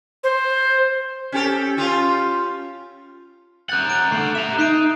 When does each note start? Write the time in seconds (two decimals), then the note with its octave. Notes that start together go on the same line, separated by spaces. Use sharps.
0.24 C5
1.32 C#4 G4 A4
1.77 C#4 F4 G4
3.69 A#4 F#5 F#6 G6 A6
3.90 D7
4.12 A3 F#5 C7
4.35 E5 A#5 E7
4.58 D#4 F#6 C7 D7